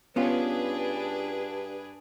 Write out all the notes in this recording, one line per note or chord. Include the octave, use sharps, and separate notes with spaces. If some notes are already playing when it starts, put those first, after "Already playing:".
G2 B3 C#4 D4 F4 G#4 B4